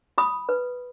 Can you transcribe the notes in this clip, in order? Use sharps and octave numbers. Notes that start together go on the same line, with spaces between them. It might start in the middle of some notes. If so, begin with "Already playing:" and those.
F4 B5 D#6
B4